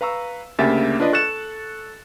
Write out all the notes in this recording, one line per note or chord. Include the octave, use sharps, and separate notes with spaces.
B4 F5 A#5 C#6 E6
D2 C#3 A#3 G4 E5 A6
D4 F4 B4 D5 D#5
A4 C#6 F#6 A6 C#7 E7